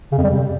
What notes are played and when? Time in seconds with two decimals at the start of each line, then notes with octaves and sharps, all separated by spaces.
0.12 C#3
0.18 F2
0.24 G3
0.30 C3